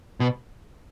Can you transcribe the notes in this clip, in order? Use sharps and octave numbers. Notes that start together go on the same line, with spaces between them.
B2